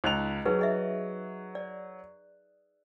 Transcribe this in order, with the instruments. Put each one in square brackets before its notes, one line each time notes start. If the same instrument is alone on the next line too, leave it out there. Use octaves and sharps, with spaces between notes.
[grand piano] C#2 F#6 F7 [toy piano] D#4 D#5 A#5
[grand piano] F#3 [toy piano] D#4 G#4 B4
[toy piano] G#4 D#5 E5
D5